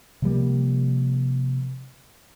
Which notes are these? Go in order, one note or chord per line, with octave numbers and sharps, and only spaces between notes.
C3 F3 G3 A#3